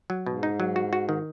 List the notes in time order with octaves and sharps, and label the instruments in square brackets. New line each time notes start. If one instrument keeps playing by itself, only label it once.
[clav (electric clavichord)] F#3
[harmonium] G#2 [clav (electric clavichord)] B2
[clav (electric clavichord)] D#4
F#3
F#4
F#4
D#3